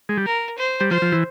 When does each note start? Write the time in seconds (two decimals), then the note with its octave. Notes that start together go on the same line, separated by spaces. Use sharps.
0.09 G#3
0.17 G3
0.26 A#4
0.58 C5
0.81 G3
0.90 F3 C5
1.02 F3
1.12 E3